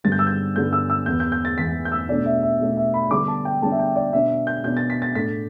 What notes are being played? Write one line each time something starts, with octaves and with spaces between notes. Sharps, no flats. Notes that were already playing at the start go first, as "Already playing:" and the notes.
G2 D3 G3 B3 A6
G6
E6
G6
G2 D3 G3 B3 G6
E6
E6
E2 E3 B3 G6
G6
G6
A6
E2 E3 B3 B6
G6
E6
B2 A3 D4 D5
E5
E5
B2 A3 D4
E5
B5
D3 G3 B3 D4 D6
A5
G5
D3 G3 B3 D4 A5
E5
G5
D5
B2 B3 D4 E5
G6
B2 B3 D4 G6
A6
B6
A6
A2 A3 D4 B6